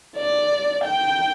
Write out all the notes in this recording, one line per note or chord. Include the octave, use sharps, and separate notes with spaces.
D5
G5